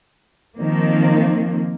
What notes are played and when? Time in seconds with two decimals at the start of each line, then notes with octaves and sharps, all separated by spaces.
0.57 D#3 F3 A#3 C4